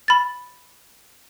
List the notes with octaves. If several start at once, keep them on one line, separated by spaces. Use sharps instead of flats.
B5 A6